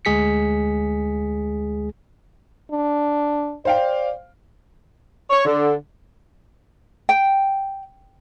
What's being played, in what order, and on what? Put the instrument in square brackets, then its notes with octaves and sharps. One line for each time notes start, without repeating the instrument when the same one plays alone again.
[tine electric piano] D2 G#3 G#4 B6 C#7
[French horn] D4
[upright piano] C5 F5 G5 [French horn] D5
[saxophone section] C#5
D3
[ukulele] G5